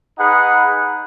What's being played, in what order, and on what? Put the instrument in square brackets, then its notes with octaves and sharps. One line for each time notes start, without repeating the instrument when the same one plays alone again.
[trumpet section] D#4 G#4 B4 F#5